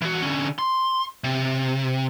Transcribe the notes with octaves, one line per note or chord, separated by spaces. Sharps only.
E3 F#4
D3 C#4
C6
C3